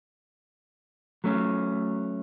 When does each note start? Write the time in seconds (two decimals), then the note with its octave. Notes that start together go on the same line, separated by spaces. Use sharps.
1.24 F#3 A3 C#4